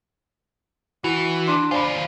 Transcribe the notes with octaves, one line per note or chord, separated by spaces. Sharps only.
E3 E4 F#4
D4 C6 D6
D#2 F4 C5 D5 G#5 B5